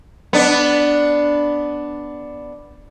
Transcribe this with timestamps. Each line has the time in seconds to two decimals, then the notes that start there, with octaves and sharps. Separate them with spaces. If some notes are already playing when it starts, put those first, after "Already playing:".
0.33 B3 D4